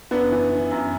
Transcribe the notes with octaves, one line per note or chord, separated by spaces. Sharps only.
F#2 B3 D4
E3
E3
F#2